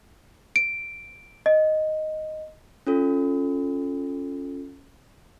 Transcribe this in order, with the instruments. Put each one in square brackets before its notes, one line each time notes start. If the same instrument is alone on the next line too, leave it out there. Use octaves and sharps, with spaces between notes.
[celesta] D7
D#5
[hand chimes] C#4 F4 A4